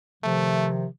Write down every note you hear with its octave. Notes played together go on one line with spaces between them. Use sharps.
C3 D#3 F3 A3